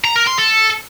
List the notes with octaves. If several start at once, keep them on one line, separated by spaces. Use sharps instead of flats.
A#5
A#4
C6
A4